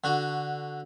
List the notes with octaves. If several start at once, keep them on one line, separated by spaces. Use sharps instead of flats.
D3 F#4